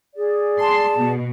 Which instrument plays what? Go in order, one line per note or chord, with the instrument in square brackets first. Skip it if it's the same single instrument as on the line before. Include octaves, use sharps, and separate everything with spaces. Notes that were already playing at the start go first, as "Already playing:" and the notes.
[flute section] G#4 D5
[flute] A5 [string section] C6
[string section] B2